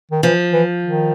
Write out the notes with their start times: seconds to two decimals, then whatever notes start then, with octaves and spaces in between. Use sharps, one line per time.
0.11 D#3
0.23 E3 F3
0.53 E3
0.84 D#3